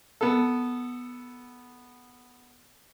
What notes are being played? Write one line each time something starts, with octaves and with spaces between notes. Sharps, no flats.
B3 A4